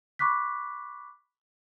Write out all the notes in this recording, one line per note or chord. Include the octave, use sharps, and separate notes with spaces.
B5 C#6 D6 F#6 B6